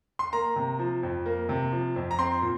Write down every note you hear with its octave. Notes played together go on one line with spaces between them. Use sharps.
C6
A#3 A#5
C3
F3
F2
A#3
C3
F3
F2
A#5
C4 C6
A#2